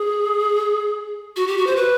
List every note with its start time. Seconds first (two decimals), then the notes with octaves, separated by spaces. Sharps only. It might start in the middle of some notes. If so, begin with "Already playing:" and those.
Already playing: G#4
1.36 F#4
1.47 G4
1.57 F#4
1.67 C5
1.76 B4